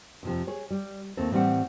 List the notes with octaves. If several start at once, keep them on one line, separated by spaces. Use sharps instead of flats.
F2 C3 F3
G#4 C#5
G3
D#2 A3 A#3 C4 A4
A2 E3 G3 C4 E5 F#5